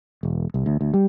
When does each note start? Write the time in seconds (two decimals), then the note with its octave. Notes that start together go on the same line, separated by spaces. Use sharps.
0.23 E1
0.54 C2
0.66 D2
0.81 D2
0.94 G3